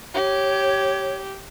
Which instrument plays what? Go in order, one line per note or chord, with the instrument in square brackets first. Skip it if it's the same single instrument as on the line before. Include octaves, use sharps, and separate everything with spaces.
[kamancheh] G4 [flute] C#5